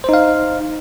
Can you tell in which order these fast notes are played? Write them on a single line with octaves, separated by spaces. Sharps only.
C5 D#4 F5